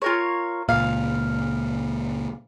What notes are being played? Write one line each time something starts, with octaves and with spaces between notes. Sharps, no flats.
F4 A#4 C#5
C#2 A#2 F5